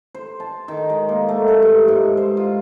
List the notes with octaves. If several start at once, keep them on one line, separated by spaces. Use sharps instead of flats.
C5
A5
D#3
G#3
A#3
A3
A4
G2
G#2
C5
F4